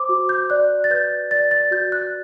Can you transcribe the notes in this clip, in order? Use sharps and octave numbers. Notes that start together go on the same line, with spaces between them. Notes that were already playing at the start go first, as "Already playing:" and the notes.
Already playing: C5 C6 D6
F#4
G6
D5 F#6
A6
B4 G6
D5 A6
A6
F#4 G6
F#6